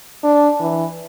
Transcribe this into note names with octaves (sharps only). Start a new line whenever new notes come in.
D4
E3